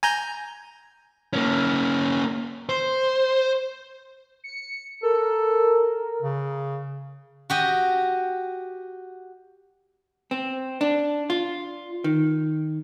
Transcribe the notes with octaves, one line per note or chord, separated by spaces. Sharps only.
G#5 A#5 G6
A#3 C#4
C5
C#7
A4 A#4
C#3
F#4 G4 D#5
C4
D4
F4
D#3